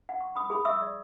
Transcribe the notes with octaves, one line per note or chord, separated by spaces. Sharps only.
F#5
C#6
B5 D#6
G#4 B5 D#6
E5 C#6 D#6 E6
D5